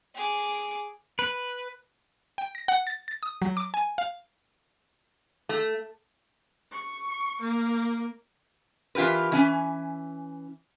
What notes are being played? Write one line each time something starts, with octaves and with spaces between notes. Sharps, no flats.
G#4 D6
B4
G5
A#6
F#5
A6
A6
D#6
F#3
D6
G#5
F5
A3
C#6
A#3
E3 F4 G4 A#4 B4
E3 C#4 G#5